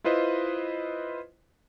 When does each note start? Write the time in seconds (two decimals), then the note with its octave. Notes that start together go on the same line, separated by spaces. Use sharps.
0.04 E4 F4 B4 C5 D#5